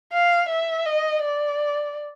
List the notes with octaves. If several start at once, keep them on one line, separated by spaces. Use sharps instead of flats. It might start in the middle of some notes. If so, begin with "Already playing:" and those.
F5
E5
D#5
D5